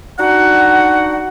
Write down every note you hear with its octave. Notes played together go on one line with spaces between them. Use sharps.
D4 D#4 F#4 F#5